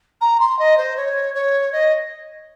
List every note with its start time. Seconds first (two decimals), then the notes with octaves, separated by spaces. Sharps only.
0.21 A#5
0.40 C6
0.59 D#5
0.77 C5
0.97 C#5
1.34 C#5
1.72 D#5